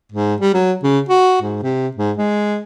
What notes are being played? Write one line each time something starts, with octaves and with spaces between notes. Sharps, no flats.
G#2
G3
F#3
C#3
F#4
G#2
C3
G#2
G#3